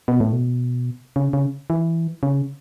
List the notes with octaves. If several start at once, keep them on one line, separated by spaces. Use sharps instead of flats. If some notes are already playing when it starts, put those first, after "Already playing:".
B2
A2
B2
C#3
C#3
E3
C#3